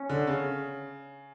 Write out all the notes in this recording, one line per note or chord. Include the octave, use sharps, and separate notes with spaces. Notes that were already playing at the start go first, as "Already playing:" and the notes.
Already playing: C#4
D3
C#3